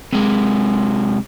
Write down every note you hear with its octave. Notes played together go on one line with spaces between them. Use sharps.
C3 G#3